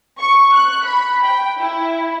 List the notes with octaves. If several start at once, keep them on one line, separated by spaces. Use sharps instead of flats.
C#6
F#6
B5
G5
E4